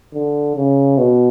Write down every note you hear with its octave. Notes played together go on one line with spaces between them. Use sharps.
D3
C#3
B2